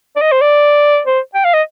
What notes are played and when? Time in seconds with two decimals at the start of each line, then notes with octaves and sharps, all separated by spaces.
0.16 D5
0.21 D#5
0.32 C5
0.41 D5
1.07 C5
1.34 G5
1.44 F5
1.54 D#5